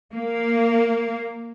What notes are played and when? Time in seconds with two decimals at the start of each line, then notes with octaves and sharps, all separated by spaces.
0.16 A#3